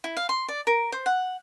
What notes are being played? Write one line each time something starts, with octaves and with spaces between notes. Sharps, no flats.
E4
F5
C6
D5
A#4
C5
F#5